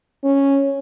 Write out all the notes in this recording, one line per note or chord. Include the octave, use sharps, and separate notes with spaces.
C#4